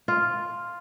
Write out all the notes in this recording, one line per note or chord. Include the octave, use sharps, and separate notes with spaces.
F4